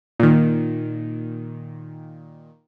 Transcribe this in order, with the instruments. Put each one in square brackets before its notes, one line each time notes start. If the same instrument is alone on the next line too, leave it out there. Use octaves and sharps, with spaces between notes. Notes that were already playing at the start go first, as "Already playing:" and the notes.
[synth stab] A#2 D#3